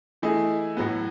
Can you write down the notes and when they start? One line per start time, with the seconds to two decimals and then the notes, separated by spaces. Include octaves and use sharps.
0.22 E3 A3 E4 G#4 D#5
0.77 A2 F#3 B3